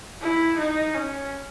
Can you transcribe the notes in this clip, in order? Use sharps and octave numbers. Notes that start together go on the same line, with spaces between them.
E4
D#4
C#4